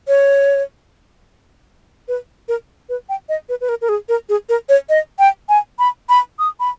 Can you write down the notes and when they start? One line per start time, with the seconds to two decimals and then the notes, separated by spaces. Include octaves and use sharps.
0.08 C#5
2.08 B4
2.48 A#4
2.89 B4
3.09 G5
3.29 D#5
3.49 B4
3.61 B4
3.69 A#4
3.81 A#4
3.89 G#4
4.09 A#4
4.29 G#4
4.49 A#4
4.69 C#5
4.89 D#5
5.19 G5
5.49 G#5
5.79 B5
6.09 B5
6.39 D#6
6.60 B5